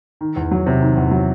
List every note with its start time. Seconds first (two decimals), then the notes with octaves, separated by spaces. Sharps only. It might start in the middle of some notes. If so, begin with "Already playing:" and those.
0.21 D#3
0.36 E2
0.51 F#3
0.66 C3
0.82 D#3
0.97 E2
1.11 F#3